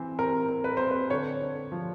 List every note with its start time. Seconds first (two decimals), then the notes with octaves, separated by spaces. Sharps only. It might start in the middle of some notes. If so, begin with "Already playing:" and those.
Already playing: E3 C4
0.19 C4 A#4
0.49 C4
0.64 B4
0.77 C4 C5
0.91 B4
1.10 D3 C#5
1.42 D3
1.72 F3